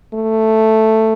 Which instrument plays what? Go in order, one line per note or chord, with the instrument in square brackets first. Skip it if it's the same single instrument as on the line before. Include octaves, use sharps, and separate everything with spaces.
[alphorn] A3